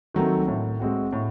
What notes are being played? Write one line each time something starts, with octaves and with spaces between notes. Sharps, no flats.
D#3 F#3 A3 C4
A2
G#3 C4 F#4
A2